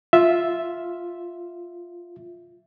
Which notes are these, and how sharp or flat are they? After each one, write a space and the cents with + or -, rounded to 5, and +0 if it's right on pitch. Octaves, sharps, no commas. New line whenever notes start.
F4 +0 E5 +0